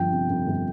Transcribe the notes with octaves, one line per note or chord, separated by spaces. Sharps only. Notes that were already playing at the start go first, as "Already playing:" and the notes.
Already playing: G1 F3 G5
C3
F2
G1